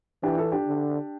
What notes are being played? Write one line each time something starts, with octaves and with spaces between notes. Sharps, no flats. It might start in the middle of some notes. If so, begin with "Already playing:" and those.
E3 D4 G4
E4 A4
D4 G4
D3